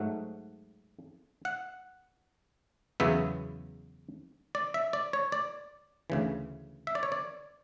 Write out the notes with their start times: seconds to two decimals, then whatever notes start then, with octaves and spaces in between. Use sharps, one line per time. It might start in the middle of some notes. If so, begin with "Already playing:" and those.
Already playing: G#2 F#3 A3 F#5
1.45 F#5
3.00 E2 C#3 F#3 B3 E5
4.55 D5
4.74 E5
4.93 D5
5.13 C#5
5.32 D5
6.10 D2 C#3 E3
6.87 E5
6.95 D5
7.03 C#5
7.12 D5